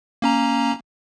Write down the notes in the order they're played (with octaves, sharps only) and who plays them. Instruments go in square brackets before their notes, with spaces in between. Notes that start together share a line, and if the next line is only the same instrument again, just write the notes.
[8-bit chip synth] A#3 C#4 A#5